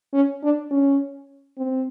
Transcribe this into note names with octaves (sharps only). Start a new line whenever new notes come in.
C#4
D4
C#4
C4